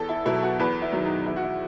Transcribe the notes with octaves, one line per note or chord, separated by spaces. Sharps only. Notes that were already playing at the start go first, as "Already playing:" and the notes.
Already playing: E2 A4
E4
B2 F#3 E4
F#4
E2 B4
E4
D#3 F#3
D#4
E2 E4
F#4
E4